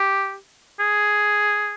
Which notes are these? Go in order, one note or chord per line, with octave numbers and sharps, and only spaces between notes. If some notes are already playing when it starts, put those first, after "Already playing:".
Already playing: G4
G#4